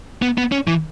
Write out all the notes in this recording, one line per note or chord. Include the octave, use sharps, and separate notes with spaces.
B3
B3
C#4
E3